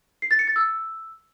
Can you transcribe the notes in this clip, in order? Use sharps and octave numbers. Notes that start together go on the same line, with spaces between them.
C7
A6
C#7
A6
E6